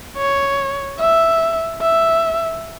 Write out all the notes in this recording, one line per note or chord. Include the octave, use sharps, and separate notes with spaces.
C#5
E5
E5